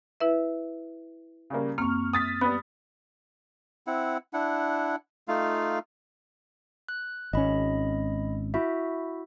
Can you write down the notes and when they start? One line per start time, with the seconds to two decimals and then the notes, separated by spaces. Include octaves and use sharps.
0.20 E4 B4 E5
1.50 C#3 G3 A#3
1.78 F#2 A#3 C4 C#6 F6
2.13 D#6 A6 B6
2.41 G3 B3 B5
3.87 C4 E4 F#5
4.33 D4 E4 F#5
5.28 A3 D#4 F4 F5
6.89 F#6
7.33 G#1 C#4 D#5 B5
8.54 E4 F#4 E5